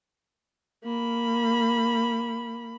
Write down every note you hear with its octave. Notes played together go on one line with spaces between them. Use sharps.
A#3 B5